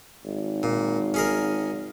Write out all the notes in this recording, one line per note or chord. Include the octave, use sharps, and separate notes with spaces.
G#1
A#2
C#4 G#4 A#4